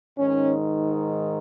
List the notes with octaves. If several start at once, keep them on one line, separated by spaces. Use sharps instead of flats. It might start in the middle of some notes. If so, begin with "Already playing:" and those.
G#2 D#3 C#4